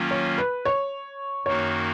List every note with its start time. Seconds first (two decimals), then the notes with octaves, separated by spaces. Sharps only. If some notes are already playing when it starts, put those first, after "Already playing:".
Already playing: D#3 F#3 A#3 C#4 F4
0.11 C#5
0.38 B4
0.65 C#5
1.46 F#2 D#3 A#3 D#4 F#4 C#5